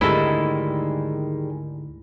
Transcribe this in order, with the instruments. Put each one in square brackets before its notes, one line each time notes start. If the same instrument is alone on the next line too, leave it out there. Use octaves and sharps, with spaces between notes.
[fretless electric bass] D2 G#2 D3 [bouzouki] D#3 G3 G#3 [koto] E4 A4